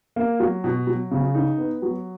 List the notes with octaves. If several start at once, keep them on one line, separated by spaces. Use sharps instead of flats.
A#3
F#3
B2
F#3
C#3
D#4
B3
F#3